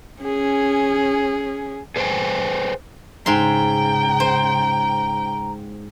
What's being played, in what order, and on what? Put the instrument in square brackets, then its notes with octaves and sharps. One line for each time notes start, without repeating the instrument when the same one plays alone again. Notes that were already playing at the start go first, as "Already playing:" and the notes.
[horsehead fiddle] C#4 G#4
[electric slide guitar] G#4 B4 C5 D5 G5 G#5
[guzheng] G#2 C6 [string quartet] C#3 G5 [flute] A#5
[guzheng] C5